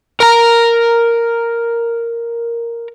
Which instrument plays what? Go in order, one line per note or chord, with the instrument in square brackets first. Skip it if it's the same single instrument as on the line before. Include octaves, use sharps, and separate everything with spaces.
[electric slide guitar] A#4 A#5